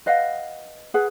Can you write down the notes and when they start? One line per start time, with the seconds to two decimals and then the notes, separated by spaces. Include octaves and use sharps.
0.06 B4 D#5 F5 F#5
0.94 G#4 B4 F#5